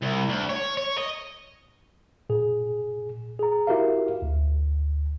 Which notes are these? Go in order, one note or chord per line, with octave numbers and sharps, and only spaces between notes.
C2
D2
C#5
C#5
D#5
A#2 G#4
G#4 A#5
E4 F#4 G4 A#4 E5 F5
D2